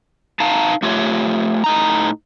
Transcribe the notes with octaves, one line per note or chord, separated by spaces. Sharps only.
D#4 F5 A5 A#5
A3 F4 G4 C#5
A2 D#4 A#5